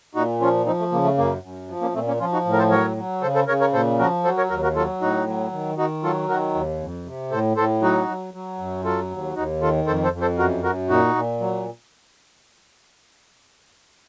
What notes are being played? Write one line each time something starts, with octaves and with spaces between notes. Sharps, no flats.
A#2 D#4 F#4
F3 C#4 F4
F3 C4 D#4
A3
C#3 A#3
A3
F#2 A#3
F#2
F3
A#3 C#4
A#2 A3 C4
A#3 C#4
F3 C#4 F4
D#4 F#4
A2
A#4
A4 C5
F#3 A#4 C#5
F#3
C#3 A4 C5
A4 C5
C#3 A#4 C#5
A#4 C#5
A#2 A4 C5
F3 F#4 A#4
F#3 A4 C5
A#4 C#5
D#2 F#4 A#4
F#4 A#4
F#3 F4 A4
A2 D#4 F#4
F#3
D#3
D#3 D#4 F#4
F#3 F4 A4
D#3 F#4 A#4
D#2
F2
C3
A2 A4 C5
A2 A4 C5
F#3 D#4 F#4
F#3
F#3
F#2
F#3 F4 A4
D#2
D#2 D#4 F#4
D#3 F4 A4
F2 A4 C5
A4 C5
F2
A4 C5
F#2 F#4 A#4
F#2 F#4 A#4
A#2 D#4 F#4
A#2
F#3